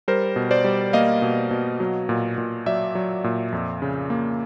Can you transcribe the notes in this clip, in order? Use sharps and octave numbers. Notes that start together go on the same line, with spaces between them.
G3 A#4 C5
B2
C5 D5
G3
A#3 D#5 F5
B2
B2
F#3
A#2
A#2
F#3 D5 E5
F#3
A#2
F2
C#3
A#3